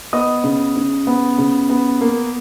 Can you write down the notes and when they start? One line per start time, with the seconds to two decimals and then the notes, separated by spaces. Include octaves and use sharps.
0.13 B3 D#5 D#6
0.44 C#3
0.76 C#3
1.07 B3
1.38 C#3
1.70 B3
2.01 A#3